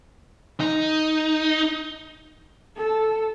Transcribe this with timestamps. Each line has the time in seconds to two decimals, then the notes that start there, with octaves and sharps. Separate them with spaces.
0.60 D#4
2.76 A4